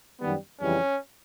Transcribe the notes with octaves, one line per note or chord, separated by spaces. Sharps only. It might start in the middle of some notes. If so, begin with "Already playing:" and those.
F#2 D#3 G3 B3
F2 C#3 E3 G3 C#4